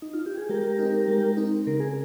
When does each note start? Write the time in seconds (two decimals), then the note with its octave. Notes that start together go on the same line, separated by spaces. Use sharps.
0.02 D#4
0.13 F4
0.26 G4
0.37 G#4
0.49 G#3 G4 A#4
0.79 C4 D#4
1.08 G#3
1.37 C4 D#4
1.67 C#3 A#4
1.80 G#4